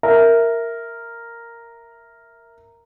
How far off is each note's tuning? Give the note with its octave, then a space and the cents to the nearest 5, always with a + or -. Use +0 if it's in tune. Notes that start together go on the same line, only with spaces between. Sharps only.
A#4 -5 E5 -5